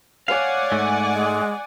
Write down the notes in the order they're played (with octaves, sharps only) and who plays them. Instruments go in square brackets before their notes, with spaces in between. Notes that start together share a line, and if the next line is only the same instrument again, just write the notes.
[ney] C#5 [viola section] D5 F#5 G#5 [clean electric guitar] F5
[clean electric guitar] G#2 A3
[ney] G#3